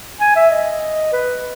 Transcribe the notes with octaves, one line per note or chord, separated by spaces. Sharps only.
G#5
E5
D#5
B4